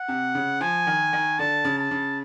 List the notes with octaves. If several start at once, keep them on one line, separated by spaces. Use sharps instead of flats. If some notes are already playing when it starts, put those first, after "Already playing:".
Already playing: F#5
C3
C#3
F3 G#5
D#3
D#3
D3 A5
C#3
A5
C#3